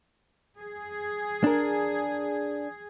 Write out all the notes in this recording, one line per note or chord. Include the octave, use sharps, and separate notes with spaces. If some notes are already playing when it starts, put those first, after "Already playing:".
G#4
D4 A#4